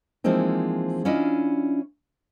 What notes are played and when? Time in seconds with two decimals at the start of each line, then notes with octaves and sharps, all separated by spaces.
0.24 E3 F3 G#3 A#3 C4 D#4
1.05 C#4 D4 E4 F4 D#5